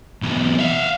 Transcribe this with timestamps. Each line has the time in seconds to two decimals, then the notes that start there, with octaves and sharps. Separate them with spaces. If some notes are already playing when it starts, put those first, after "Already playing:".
0.22 B1 E2
0.59 E5 F5